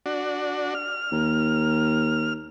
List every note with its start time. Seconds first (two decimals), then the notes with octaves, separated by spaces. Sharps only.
0.06 D4 F#4
0.75 F6
1.12 D#2